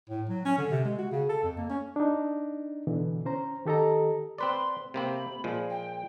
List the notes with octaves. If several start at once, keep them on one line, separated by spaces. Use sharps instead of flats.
A2
F#3
C#4
D3
C3
G#3
F#4
C#3
A4
F2
A#3
C#4
D4 D#4
B2 D3 E3
C#4 C5 A#5
D#3 G4 A4 D#5 A#5
C4 B4 D5 C6
C3 A#3 C4 B5
A#2 F3 G#3
G5